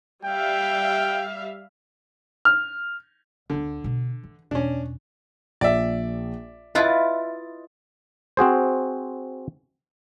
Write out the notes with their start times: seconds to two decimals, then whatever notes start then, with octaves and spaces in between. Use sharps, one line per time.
0.25 G3 E5 F5 G5
2.45 F6
3.50 D2 D3 B3
3.84 B2 D4
4.23 E3
4.51 E2 B2 C#4 D4
5.61 A#1 D5 E5
6.75 E4 F4 B4 D#5 A6
8.37 C4 F#4 G#4 C5